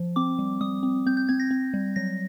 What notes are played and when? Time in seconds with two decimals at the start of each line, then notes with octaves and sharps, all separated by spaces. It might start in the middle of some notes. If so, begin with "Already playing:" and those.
Already playing: F3
0.16 C4 D6
0.39 G3
0.61 G3 D#6
0.83 C4
1.06 C4 G6
1.17 G6
1.29 C4 G#6
1.40 A#6
1.51 C4
1.74 G3
1.96 F#3 A#6